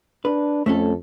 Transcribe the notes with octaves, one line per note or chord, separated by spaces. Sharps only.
D4 B4
F2 A3 C#4 A4